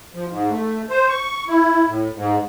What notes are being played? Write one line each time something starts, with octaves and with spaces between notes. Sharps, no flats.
F3
G#2
A3
C5
C#6
E4
A2
G#2